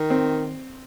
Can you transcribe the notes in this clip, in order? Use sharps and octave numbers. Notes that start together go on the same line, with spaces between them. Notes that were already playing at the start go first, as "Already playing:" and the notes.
Already playing: D#3
C4